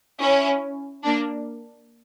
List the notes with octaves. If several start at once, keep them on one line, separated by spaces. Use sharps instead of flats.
C#4 E4
A#3 D4